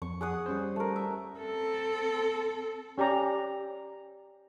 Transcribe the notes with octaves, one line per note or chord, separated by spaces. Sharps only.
F2 C#6
G#4 F#5 D#6
G3 C#4 C5
A3 A#4
E5
C4 A4
C#4 G4 D5 A#5